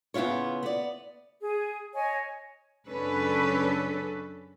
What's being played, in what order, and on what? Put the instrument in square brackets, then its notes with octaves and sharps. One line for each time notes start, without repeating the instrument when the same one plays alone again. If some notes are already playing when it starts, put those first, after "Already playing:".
[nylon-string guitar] C#3 B3 E4 F4 C#5
B3 D5
[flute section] G#4
C#5 D#5 G#5
[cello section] F#2 C#3 C#4 D4 A4 B4